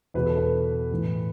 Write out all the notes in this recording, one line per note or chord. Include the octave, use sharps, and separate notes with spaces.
E2 B2 B4
A4
B4
A2 E3